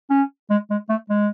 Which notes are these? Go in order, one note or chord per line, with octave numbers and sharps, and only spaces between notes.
C#4
G#3
G#3
A3
G#3